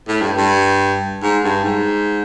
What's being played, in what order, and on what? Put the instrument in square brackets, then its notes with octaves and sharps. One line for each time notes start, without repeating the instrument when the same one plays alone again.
[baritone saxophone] A2
G2
G2
G#2
G2
G#2